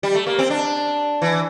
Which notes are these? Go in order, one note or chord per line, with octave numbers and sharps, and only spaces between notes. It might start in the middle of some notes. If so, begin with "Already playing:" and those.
G3
A3
A#3
C4
D4
E3